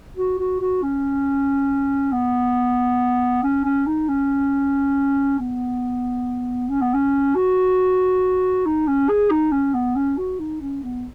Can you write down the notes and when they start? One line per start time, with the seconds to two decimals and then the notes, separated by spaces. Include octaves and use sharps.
0.17 F#4
0.39 F#4
0.60 F#4
0.82 C#4
2.12 B3
3.43 C#4
3.65 C#4
3.86 D#4
4.08 C#4
5.39 B3
6.69 C#4
6.81 B3
6.94 C#4
7.35 F#4
8.66 D#4
8.87 C#4
9.09 G#4
9.31 D#4
9.52 C#4
9.74 B3
9.96 C#4
10.18 F#4
10.39 D#4
10.61 C#4
10.83 B3